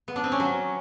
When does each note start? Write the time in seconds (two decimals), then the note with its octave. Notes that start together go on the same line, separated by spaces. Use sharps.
0.08 B3
0.16 D4
0.24 C4
0.32 C#4
0.40 F#3